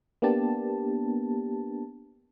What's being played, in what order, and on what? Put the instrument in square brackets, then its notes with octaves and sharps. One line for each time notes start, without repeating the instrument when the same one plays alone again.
[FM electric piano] A#3 B3 D4 G4 A5